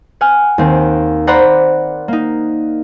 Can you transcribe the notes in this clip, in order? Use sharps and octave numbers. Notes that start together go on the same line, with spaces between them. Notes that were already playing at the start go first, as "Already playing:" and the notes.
F#5 G#5 F6
D#2 C4
A#4 C5 D5 F#5 A#5 B5
A#3 D#4